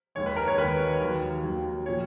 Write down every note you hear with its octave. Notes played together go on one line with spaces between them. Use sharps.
D#2 D#3 G#3 C#5
B4
A#4
C#5
D#2 D#3 G#3 B4
D#2 D#3 F#3
D#2 D#3 F#3
A#2 F3 C#5